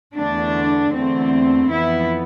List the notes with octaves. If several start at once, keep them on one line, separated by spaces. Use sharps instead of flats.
E2 D3 A3 D4
E2 D3 A3 C4
F2 E3 B3 E4